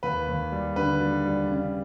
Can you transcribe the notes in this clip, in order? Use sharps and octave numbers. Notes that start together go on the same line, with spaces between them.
D#2 B4
D#2
G3
D3 B4
G3
G3
C#3